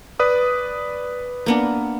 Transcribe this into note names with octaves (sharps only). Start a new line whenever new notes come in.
B4 D5 D#6
A#3 B3 D4